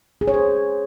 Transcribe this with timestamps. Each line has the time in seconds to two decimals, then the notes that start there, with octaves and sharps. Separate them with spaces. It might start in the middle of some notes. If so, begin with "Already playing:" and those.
0.21 G#4
0.28 C#5
0.34 C5